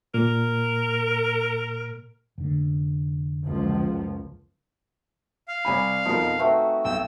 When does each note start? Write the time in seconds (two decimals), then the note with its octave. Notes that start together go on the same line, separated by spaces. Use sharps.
0.14 A#2 A#4
2.38 F1 D3
3.45 F#1 C#2 F3
5.48 F5
5.65 C2 G#5 B5
6.05 F2 B2 F3 D#4 A#4
6.39 A3 C4 F#4 B4
6.85 B1 G5 E6